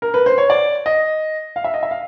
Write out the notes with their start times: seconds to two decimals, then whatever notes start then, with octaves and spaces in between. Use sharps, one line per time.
0.02 A#4
0.14 B4
0.26 C5
0.38 C#5
0.50 D5
0.86 D#5
1.56 F5
1.64 E5
1.74 D#5
1.83 E5
1.91 F5